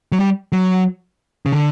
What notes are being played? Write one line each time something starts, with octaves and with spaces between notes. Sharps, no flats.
F#3
G3
F#3
C#3
D3